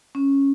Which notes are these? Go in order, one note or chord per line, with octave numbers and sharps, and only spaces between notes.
C#4